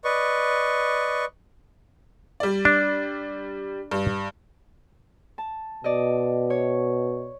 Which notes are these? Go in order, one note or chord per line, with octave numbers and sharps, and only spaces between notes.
B4 D5 D#5 C#6
G3 D5
D4
G2
A5
B2 D5 D#5
C#5